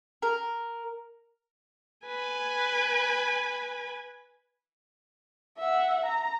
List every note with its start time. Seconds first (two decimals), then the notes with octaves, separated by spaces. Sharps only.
0.22 A#4
2.07 B4 G#5
5.59 E5 F#5
6.06 A#5